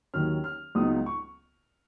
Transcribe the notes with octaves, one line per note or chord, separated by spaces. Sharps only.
D#2 D#3 F#3 C#4 F6
F6
C#2 C#3 F#3 B3 D#4 D#6
C#6